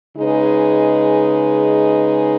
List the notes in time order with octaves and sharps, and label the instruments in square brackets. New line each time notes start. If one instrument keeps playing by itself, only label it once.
[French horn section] C#3 G#3 D#4 G#4 B4